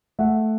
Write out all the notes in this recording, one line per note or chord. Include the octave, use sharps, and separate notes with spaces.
A3 E5 F#5